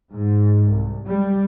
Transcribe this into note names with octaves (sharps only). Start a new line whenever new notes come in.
G#2
C2
G3